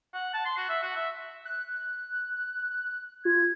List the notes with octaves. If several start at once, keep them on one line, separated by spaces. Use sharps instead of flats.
F#5
A5
C6
F#4
E5
F#4
E5
F#6
F4 G#6